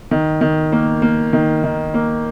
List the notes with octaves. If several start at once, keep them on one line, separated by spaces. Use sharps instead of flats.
D#3
D#3
A#3
A#3
D#3
D#3
A#3